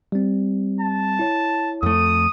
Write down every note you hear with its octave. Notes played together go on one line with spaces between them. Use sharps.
G3 C4
A5
E4 C#5
F2 A3 D#6